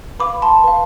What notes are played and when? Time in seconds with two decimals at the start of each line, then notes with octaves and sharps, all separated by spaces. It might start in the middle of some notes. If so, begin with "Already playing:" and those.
0.19 B4 F5 B5 D6
0.42 A5 C6
0.64 B4 F5